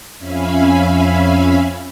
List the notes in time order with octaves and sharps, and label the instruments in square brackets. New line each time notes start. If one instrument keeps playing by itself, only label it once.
[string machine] F2 C#4 E5 F5 G#5 B5